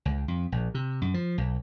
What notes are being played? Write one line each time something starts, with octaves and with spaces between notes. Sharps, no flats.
C#2
F2
A#1
C3
F#2
F3
B1